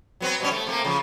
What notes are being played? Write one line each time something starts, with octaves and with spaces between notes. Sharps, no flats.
F#3 B3 C4
B2 G3 C#4
A3
C3 A3 A#3
C#3 F3